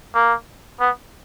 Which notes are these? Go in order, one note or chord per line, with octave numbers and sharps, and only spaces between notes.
A#3
B3